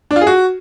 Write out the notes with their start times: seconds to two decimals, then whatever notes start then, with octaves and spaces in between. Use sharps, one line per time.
0.11 D4
0.16 F4
0.21 G#4
0.27 F#4